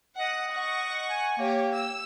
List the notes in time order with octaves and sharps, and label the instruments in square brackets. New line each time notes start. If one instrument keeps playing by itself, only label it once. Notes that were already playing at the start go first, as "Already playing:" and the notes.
[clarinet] D#5 [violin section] F#5
[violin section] F#5 C#6
[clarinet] G#5
[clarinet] A#3 [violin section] G4 C#5
[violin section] E6